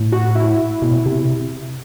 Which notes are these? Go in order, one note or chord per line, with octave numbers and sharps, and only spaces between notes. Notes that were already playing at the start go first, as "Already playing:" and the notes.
Already playing: A2
F#4
E4
B2
C3